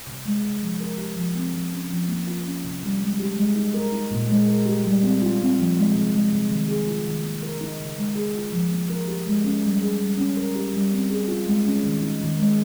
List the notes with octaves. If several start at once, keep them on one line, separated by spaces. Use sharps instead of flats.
C3
G#3
C3
F3
A#4
G4
F3
C4
F3
C#4
F3
A#3
F4
C#4
C3
G3
G#3
G4
G#3
D#4
A#4
D#4
A#2
G#3
A#4
G4
G3
C4
F4
C4
F3
G#3
C3
G#3
C3
D#3
G#4
F4
D#3
A#3
A#4
D#4
C#3
G#3
G#4
F4
F3
A#3
A#4
G4
G#3
C#4
G3
G#4
G3
C#4
A#4
G4
G3
C4
G#4
F4
G#3
C#4
D#3
D#4
D#3
G#3